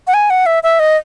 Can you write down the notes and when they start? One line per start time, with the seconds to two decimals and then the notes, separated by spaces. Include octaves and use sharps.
0.07 F#5
0.14 G#5
0.30 F#5
0.46 E5
0.63 E5
0.79 D#5